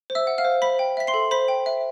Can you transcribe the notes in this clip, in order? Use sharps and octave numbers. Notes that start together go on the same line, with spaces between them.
C5
E5 E6
F#5
F5 F6
C5
C5 B5 B6
G5
E5 B6
C6 C7
A4
C5 B5 B6
G5
E5